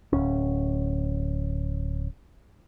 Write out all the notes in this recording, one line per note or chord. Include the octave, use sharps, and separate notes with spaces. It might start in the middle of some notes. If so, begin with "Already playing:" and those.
D1 C#4